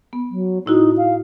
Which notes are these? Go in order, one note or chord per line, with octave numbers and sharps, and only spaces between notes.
B3
F#3
A2 D#4 E4 F#4
F5